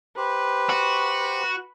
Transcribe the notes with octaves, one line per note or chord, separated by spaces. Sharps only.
G4 B4 C5
F#4